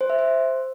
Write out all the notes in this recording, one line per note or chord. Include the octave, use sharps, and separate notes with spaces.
C5
E5
C5